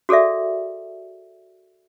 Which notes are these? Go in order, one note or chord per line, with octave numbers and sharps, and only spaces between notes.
F#4 G#4 A4 D5 E5